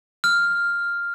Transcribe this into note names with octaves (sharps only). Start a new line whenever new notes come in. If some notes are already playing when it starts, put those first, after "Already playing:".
F6